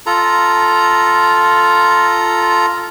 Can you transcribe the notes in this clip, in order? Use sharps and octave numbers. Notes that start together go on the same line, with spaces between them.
F4 A4 A#5